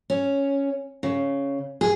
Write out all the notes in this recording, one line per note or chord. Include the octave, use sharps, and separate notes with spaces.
C#4
C#3
G#4